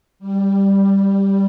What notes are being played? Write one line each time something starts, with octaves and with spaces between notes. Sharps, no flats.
G3